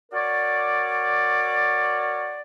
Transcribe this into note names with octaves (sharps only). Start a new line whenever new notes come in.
F#4 A#4 C#5 D5